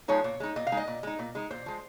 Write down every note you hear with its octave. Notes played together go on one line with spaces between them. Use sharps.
F3 G#3 D#4 C#5
A#2
G#3 D#4
A#2 D#5
F5
G#3 D#4
D#5
A#2
G#3 D#4
A#2
G#3 D#4
A#2 C5
F3 G#3